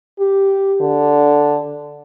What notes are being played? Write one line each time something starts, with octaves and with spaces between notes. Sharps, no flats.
G4
D3